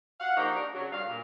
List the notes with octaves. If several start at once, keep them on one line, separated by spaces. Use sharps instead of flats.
F5 F#5
F3 A#3 D#4 F#4 G4
D4 A#4
C#3 F#3
G2 F5
A#2